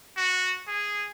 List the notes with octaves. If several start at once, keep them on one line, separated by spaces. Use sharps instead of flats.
F#4
G#4